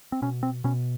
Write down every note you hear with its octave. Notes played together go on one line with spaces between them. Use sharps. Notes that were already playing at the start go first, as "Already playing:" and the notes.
C4
B2 C#4
C4
B2 C#4